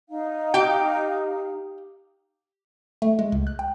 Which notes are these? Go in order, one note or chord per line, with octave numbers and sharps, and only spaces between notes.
D#4 F5
G4 G5
A3
G#3
C#2
F#6
G5